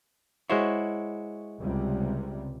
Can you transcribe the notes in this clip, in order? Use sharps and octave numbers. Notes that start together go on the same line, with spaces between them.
G#3 E4 F#4 C5 C#5
C#2 C3 G3